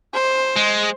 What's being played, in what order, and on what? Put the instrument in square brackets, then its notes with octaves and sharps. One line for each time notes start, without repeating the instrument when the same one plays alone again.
[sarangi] C5
[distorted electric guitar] G#3